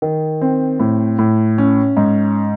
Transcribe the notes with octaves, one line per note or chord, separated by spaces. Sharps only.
D#3
C4
A2
A2
C#4
G#2